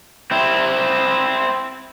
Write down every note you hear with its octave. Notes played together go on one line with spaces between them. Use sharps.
C4 E4